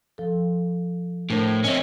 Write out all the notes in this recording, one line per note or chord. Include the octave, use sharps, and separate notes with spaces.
F3 A4
A2 D4 A#4 C5
C4 C#4 C#5 D#5 E5